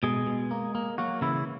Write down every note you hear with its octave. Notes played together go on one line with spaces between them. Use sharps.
B2 G#3 G#4
B2
A#3
A#3
F#3 A#3 F#4
C#3 E3 E4